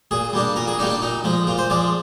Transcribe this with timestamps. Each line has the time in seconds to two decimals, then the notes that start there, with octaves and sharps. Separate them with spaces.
0.11 A#2 G#4
0.33 G3 A#3 D4
0.56 A#2 A#4
0.68 G#4
0.78 G3 A#3 D4 D#4
0.90 D4
1.02 A#2 D#4
1.24 F3 G#3
1.47 A#2 F4
1.58 C5
1.70 F3 G#3 D5